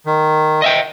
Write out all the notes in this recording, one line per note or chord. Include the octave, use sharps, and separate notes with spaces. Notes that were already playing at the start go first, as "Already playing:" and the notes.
D#3
D#5 E5 G5